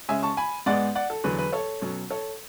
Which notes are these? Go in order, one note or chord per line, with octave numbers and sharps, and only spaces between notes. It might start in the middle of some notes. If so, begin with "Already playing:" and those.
C#3 G#3 C#4 E5 G#5
A5 C#6
G#5 B5
G#2 G#3 B3 D5 F#5
D5 F#5
A4
E2 D3 F#3 B4
B4
A4 C#5
B2 F#3 C#4
A4 C#5